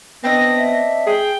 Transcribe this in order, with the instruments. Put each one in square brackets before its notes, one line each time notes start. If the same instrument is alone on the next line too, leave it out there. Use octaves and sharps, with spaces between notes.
[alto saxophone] B3 [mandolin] C4 D4 D#5 [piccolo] A#6
[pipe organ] E5
[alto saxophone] G#4 [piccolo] G5